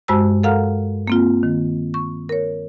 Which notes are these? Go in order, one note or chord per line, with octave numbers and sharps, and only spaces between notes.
G2 G#3 F#4 C5 A5 E6
A4 A#4 F5 F#5 A#5 F6
A#3 C4 F4
D#3
C#6
A#4 C#5